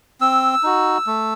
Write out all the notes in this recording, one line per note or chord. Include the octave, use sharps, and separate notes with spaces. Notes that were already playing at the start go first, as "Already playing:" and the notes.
C4 E6
D#4 F#4
A3